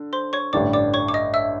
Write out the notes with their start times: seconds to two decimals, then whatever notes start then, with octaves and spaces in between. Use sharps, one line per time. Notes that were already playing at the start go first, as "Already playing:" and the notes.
Already playing: D3
0.13 C5 C6
0.33 C#5 C#6
0.53 A1 G2 D3 G3 D5 D6
0.73 D5 D6
0.94 C#5 C#6
1.08 D6
1.14 D#5 D#6
1.34 E5 E6